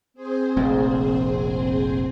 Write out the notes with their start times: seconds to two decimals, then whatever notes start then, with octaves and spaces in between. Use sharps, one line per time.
0.14 C4 G#4 C5
0.56 F1 A#1 F2